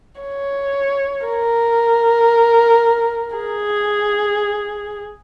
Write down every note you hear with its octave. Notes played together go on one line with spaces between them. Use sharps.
C#5
A#4
G#4